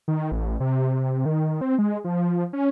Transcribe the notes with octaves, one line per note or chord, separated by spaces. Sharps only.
D#3
A1
C3
D#3
C4
G#3
F3
C#4